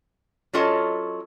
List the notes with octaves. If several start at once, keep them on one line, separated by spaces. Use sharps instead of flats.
F#3 C#4 F4 A4 D#5 A5